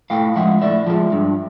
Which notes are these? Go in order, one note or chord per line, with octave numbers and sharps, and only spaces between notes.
A2 F5 G5
F3 G#3 E5 F#5
A2 D5 E5
F3 G#3
G2